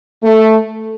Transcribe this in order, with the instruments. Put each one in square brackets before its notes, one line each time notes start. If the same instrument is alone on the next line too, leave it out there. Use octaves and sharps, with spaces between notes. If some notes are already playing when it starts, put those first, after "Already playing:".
[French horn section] A3